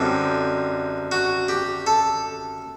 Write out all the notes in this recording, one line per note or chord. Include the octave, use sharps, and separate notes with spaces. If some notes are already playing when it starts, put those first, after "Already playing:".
Already playing: F#2 D3 G3 C4 D#4
F#4
G4
A4